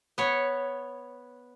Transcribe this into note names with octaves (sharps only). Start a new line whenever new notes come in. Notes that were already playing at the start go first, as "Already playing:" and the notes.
B3 C#5